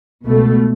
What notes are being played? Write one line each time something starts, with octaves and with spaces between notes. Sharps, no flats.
C#2 B2 A3